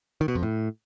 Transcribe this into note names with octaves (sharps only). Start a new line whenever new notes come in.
D#3
B2
F2
A2